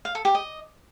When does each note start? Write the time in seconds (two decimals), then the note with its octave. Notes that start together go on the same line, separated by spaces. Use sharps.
0.05 F5
0.15 A4
0.25 G4
0.35 D#5